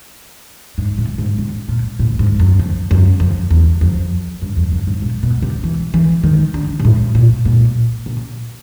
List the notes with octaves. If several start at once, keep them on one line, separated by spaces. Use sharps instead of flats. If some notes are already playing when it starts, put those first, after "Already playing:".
G#2
A2
G#2
A2
A#2
A2
G#2
F#2
F2
F#2
F2
E2
F2
G2
F2
F#2
G#2
A#2
B2
C3
E3
E3
D#3
D3
G#2
A2
A#2
A#2
A#2